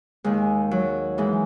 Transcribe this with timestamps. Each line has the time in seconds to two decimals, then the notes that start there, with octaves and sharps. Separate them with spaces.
0.24 D#2 D#3 G#3
0.71 F#3
1.18 G#2 E3 G#3